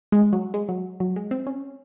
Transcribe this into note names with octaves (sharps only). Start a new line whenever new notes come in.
G#3
F#3
G#3
F#3
F#3
G#3
C4
C#4